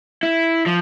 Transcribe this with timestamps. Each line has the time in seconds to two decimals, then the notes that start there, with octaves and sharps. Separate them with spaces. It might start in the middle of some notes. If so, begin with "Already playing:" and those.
0.23 E4
0.66 F3